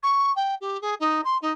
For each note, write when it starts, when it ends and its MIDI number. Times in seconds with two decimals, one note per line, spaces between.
0.03 0.31 85
0.36 0.55 79
0.61 0.80 67
0.81 0.94 68
1.00 1.21 63
1.24 1.37 84
1.42 1.52 63